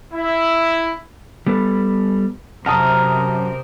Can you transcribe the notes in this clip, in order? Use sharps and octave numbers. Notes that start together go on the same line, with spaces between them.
E4
G3 B3 A4 B4
C2 F#2 C3 A#4 C5 F#5 A5 D#6